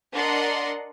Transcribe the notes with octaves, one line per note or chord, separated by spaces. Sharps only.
D4 A#4 D5 D#5 F#5 C6